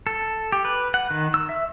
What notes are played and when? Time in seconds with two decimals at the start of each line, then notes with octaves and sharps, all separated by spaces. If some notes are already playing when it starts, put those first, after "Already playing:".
0.07 A4
0.52 G4
0.65 B4
0.94 F#5
1.11 D#3
1.34 E6
1.49 E5